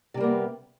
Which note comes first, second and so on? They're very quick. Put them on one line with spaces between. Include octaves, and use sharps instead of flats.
C3 G3 A#3 B3